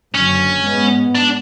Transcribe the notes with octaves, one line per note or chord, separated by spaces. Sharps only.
F#1 F#2 D3 C#4
G#2 G#3 B3
D4